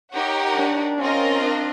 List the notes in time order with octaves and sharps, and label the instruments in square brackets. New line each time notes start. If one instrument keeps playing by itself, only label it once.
[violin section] D#4 G4 A#4 C#5 F#5
[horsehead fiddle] D4
[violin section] C4 F4 A#4 D#5 [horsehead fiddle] C#4
[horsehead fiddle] D4